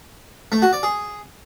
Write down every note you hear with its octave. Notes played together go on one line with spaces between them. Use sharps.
A3
F#4
D5
G#4